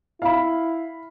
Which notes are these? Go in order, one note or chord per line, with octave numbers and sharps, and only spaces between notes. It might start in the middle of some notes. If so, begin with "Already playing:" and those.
E4 F5 B5